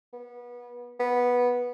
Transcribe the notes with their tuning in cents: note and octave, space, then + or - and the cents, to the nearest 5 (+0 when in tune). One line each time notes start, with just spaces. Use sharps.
B3 -25
B3 -10